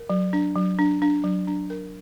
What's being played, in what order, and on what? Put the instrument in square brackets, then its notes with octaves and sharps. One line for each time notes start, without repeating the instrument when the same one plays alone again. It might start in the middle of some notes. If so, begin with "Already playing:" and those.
Already playing: [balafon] A#4
F#3
D4
F#3
D4
D4
F#3
D4
A#4